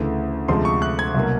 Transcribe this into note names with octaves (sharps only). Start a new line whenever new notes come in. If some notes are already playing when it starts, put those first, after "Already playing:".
Already playing: D2 C#3 E3 A3
D2 C3 F3 G#3 C6
C#6
F#6
G#6
C2 B2 F#3 A#3